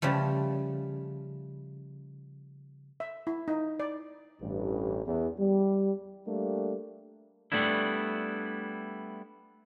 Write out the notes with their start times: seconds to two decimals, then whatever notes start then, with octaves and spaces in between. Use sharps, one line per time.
0.02 C#3 F3 G3 A3
3.00 E5
3.27 E4
3.48 D#4
3.80 D5
4.41 A1 G2
5.06 E2
5.39 G3
6.27 G3 A3 A#3 D4
7.52 G3 A3 B3 D4 E4